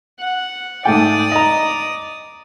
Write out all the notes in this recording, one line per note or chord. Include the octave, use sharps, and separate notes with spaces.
F#5
G#2 A3 D5 G5 D#6
D#5 A#5